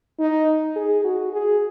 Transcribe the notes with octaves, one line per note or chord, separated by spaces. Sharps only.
D#4
G#4
F#4
G#4